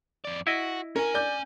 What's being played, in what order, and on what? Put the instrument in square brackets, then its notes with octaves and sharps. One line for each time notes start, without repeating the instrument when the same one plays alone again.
[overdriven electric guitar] F2 D5
[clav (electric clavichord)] E4 D#5 [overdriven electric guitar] F#4
[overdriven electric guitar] C#4 G#5 [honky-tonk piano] A#4
[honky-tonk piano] D5 G6